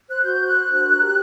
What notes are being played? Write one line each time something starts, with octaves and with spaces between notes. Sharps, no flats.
C5 F#6
F#4 G6
C5
F#6
F#4
D4
A#4
G4